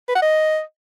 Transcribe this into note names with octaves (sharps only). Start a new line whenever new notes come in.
B4
F#5
D#5